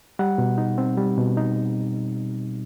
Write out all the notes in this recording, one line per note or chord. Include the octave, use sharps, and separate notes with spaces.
G3 F#5
B2
D#4
C4
G3
B2
D#4